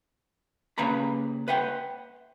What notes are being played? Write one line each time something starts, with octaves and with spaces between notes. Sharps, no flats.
C#3 A#3 B4 A#5 B5
B4 E5 F#5 G5